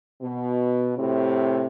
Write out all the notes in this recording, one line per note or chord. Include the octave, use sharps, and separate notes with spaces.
B2
A2 C3